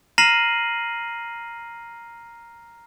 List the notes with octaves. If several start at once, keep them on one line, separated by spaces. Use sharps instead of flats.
A#5 F6 A#6 C7 D#7 F#7